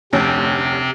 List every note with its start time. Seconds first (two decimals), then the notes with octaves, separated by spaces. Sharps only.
0.13 F1 D2 C3 C4 C#4